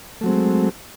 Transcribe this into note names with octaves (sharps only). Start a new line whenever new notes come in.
F#3 G#3 A3 C4